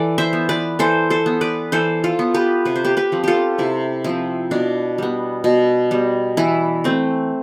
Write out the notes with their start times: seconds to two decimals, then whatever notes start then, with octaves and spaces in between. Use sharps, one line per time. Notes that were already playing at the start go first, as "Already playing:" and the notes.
Already playing: E3 A4 D5
0.18 C5 E5
0.33 B3
0.49 B4 D5
0.79 E3 A4 C5
1.10 A4 C5
1.26 B3
1.41 B4 D5
1.72 E3 A4 C5
2.04 F4 A4
2.19 B3
2.34 G4 B4
2.65 C3 B4
2.76 C5
2.85 G4 B4
2.97 G4 B4
3.12 F3 C4
3.24 F4 G4 A4
3.58 C3 E4
4.04 F3 C4 E4
4.51 B2 D4
4.98 G3 B3
5.44 B2
5.91 G3 B3
6.37 E3 E4
6.84 A3 C4